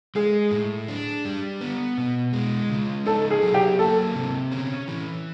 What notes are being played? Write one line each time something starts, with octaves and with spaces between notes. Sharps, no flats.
G#3 G#4
A2
D4
G3
B3
B2
G#3
C#3
D#4 A4
G#4
F#3
G4
A#3 A4
C3
C#4
E3